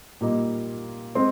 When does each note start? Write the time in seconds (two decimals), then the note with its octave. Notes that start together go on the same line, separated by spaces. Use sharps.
0.21 A#2 G3 A#3 D#4
1.15 G#3 C4 C6